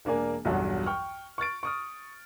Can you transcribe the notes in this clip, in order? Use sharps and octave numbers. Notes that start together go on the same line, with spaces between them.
E1 A#3 D4 A#4 D5 G#5
B1 E2 G2 F#3
G5 C#6 F6
C#6 F6 A6 D7
C#6 D#6 F6